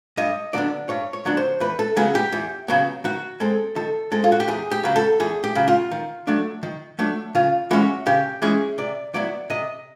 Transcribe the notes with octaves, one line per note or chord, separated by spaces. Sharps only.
G2 D#5
D3 F#3 B3 D4 D5
G2 C#5
C#5
D3 F#3 B3 D4
C5
E2 B4
A4
C#3 F#3 B3 G#4
G4
E2
C#3 F#3 B3
D#3 F#4
G#3 C4 A4
D#3 A4
G#3 C4 A4
F4
F#4
G4
E2 G#4
G4
C#3 F#3
A4
E2 G#4
G4
C#3 F#3
F4
D#3
F#3 A3 D4
D#3
F#3 A3 D4
C#3 F4
E3 G#3 C#4 F#4
C#3 G4
E3 G#3 C#4 G#4
C3 D5
D#3 F#3 B3 E4 D5
C3 D#5